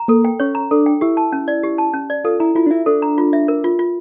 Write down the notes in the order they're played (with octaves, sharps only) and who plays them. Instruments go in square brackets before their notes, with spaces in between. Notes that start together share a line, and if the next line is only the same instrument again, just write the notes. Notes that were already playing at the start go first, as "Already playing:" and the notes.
Already playing: [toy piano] A#5
[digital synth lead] A#3 [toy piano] A4
[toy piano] G5
[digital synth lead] C#4 [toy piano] C#5
[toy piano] A#5
[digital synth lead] D4 [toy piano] A4
[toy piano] G5
[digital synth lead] E4 [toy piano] G4
[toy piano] A5
C#4
D5
G4
A5
C#4
D5
[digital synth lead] F4 [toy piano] A4
[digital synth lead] E4 [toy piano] A#5
[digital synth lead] E4 [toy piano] F4
[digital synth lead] D4
[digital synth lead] E4 [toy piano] E5
[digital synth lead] D4 [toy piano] A4
[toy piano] A#5
F4
E5
A#4
F4
F4